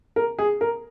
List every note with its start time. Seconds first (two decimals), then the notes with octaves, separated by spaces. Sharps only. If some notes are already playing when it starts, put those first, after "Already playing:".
0.16 A#4
0.39 G#4
0.61 A#4